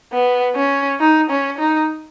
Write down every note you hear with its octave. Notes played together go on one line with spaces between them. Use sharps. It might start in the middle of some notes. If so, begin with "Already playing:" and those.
B3
C#4
D#4
C#4
D#4